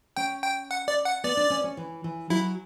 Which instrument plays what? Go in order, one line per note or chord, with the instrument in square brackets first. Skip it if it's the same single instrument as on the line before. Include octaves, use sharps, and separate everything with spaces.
[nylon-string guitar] C#4 [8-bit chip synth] G5
[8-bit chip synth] G5
F#5
D5
F#5
[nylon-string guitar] B3 [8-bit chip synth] D5
[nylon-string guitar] D4
C#4
C#4
E3
E3
[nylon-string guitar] F#3 [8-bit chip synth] E4